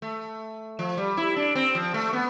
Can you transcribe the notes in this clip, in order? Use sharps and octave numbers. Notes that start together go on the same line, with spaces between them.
A3
F3
G3
E4
D4
C4
F3
A3
B3